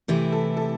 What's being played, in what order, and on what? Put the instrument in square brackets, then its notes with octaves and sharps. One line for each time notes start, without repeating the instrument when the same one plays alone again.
[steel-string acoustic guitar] C3 E3 A3 E4 [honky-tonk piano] G4
[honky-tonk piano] A4
A4